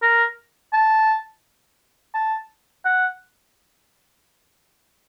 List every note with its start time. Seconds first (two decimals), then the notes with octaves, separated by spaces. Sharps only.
0.02 A#4
0.73 A5
2.15 A5
2.85 F#5